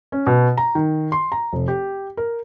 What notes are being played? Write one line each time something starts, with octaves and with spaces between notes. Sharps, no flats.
C#4
B2
A#5
D#3
C6
A#5
F1
G4
A#4